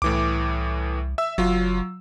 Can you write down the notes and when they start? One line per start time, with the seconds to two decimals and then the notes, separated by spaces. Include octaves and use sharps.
0.02 C2 A2 E3 D6
1.18 E5 E6
1.38 F#1 F#3 F4